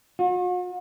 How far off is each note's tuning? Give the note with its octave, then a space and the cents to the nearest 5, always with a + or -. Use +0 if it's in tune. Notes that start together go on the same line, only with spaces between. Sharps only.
F#4 -45